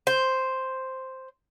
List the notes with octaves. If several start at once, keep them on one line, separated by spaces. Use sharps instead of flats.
C5